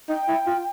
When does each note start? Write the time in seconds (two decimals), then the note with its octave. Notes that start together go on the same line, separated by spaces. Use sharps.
0.09 D#4 G5
0.28 E4
0.47 F4